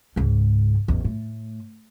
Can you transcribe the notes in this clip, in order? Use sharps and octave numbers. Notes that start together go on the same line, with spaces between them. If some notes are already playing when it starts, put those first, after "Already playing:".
C#2 G#2
A1 E2
A2